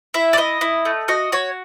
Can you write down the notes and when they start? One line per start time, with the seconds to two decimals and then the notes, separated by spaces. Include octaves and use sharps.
0.14 E4 E5
0.33 D5
0.37 E4 D#5
0.61 E4
0.85 A3
1.08 F#4 D#5
1.32 F#4 C#5